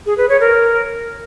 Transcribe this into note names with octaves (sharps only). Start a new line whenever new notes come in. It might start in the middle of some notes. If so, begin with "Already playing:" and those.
G#4
B4
C#5
A#4